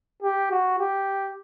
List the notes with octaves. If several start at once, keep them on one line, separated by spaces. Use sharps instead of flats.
G4
F#4
G4